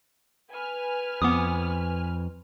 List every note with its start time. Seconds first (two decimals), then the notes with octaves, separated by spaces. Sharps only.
0.50 B4 G#5 F6
1.22 F2 B3 D6 D#6